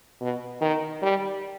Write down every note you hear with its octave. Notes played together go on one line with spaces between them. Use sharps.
B2
D#3
G3